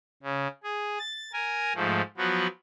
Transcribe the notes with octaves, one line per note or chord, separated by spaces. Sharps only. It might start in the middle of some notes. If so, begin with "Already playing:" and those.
C#3
G#4
A6
A#4 G#5
G#2 F3 A3
F3 F#3 B3 F#4